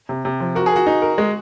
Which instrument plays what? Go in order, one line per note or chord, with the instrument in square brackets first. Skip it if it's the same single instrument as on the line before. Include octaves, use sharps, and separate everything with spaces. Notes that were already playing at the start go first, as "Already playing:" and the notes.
[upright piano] C3
C3
F3
[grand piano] F#4 [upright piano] A#4
[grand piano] G#4
[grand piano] F#4 [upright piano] A#4
[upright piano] D#4
A#4
G#3